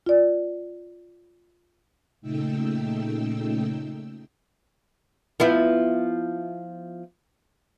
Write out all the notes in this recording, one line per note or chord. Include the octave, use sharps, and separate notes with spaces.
F4 D5
A#2 C#3 A3 D#4 G5 E6
F3 B3 E4